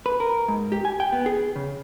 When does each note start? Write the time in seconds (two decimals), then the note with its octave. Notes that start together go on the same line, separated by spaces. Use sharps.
0.06 B4
0.20 A#4
0.48 G#2
0.72 G4
0.85 G#5
1.00 G5
1.12 B3
1.26 G#4
1.56 C#3